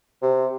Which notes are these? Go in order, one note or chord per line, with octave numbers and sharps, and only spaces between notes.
C3